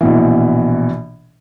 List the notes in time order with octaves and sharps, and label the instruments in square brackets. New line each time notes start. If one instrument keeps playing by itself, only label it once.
[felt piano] A#1 B2 E3